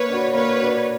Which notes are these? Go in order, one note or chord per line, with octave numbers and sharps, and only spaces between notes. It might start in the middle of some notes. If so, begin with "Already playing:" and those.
Already playing: A#3 B4 C#5
D4 F#4
A#3 B4 C#5
D4 F#4